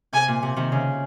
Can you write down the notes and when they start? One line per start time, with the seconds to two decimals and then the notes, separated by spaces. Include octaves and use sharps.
0.13 C3 G#5
0.28 A#2
0.43 C3
0.56 C3 D#3
0.72 C#3